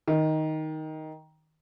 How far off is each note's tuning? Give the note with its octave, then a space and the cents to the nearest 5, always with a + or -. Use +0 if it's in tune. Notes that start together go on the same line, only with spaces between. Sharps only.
D#3 +5